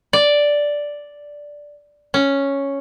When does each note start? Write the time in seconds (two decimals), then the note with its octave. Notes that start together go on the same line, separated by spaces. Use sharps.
0.13 D5
2.14 C#4